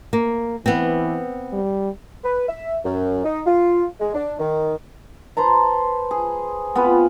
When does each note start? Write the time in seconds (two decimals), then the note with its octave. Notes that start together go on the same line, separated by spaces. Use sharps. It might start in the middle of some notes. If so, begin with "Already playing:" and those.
0.13 A#3
0.66 E3 B3 C4
1.53 G3
2.24 B4
2.48 E5
2.84 F#2
3.24 D#4
3.46 F4
4.00 G#3
4.14 D4
4.39 D#3
5.37 B4 C5 A5 A#5
6.11 G#4
6.75 B3 C4 F4 B4